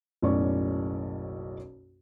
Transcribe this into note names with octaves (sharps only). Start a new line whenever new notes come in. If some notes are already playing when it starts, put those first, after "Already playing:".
F#1 B1 A2 C#4 D5 C#6